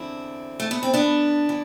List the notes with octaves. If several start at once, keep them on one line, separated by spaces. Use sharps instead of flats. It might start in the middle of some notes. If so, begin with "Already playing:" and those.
Already playing: E2 D3 C4 E4
A3
B3
C4
B3 D4
E3